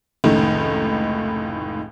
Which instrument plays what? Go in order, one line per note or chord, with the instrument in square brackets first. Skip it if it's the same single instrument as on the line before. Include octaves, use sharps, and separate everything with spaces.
[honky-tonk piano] F1 C#2 A2 D#3